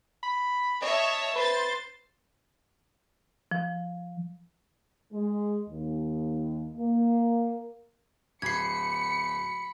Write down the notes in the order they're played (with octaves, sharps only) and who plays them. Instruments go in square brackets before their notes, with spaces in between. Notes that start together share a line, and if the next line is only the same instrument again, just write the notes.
[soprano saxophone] B5
[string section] C#5 E5 A5 [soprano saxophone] D#5
[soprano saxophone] B4 [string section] C5 A6
[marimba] F3
[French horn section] G#3
D#2
A#3
[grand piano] D1 [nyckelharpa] B5 [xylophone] G#6 C7 [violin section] C#7